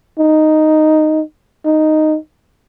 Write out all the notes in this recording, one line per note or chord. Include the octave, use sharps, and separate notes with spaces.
D#4
D#4